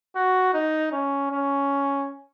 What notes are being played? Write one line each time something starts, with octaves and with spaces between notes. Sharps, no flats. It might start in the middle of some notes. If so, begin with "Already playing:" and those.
F#4
D#4
C#4
C#4